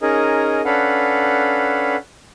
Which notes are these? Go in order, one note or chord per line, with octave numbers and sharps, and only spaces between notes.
C#4 D#4 G#4 A#4 D#5
C#4 D4 A4 B4 F5 F#5